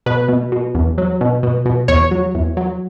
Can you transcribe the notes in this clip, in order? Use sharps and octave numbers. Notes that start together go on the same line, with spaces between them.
B2 B4
B2
B2
E2
F#3
B2
B2
B2
E2 C#5
F#3
E2
F#3